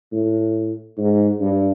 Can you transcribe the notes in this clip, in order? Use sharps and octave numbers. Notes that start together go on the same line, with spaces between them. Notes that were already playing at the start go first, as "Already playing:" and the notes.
A2
G#2
G2